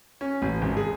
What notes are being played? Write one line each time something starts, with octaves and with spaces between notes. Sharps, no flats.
C#4
A1
G#1
G#4